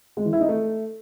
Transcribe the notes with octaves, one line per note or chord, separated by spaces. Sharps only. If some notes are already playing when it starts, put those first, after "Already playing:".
G#3
E3
E4
D#4
A3